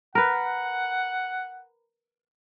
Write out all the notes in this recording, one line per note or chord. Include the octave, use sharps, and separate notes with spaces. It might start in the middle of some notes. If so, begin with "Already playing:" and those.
A#4 B4 F#5